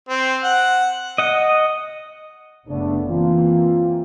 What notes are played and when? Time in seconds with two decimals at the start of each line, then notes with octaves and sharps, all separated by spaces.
0.09 C4
0.44 F#5
1.18 D#5 F#5
2.68 F#1 C#3 A3 B3 D4
3.08 E3 A#3 C4 F4